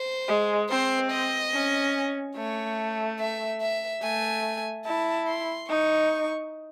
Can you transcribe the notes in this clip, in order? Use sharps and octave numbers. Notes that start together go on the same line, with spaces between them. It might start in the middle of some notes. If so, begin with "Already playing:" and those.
Already playing: C5
G#3
C4 C5
D#5
C#4
A3 C#5
E5
E5
A3 G#5
E4 A5
C6
D#4 C#6